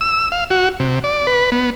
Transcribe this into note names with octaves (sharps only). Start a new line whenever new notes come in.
E6
F5
F#4
C3
D5
B4
B3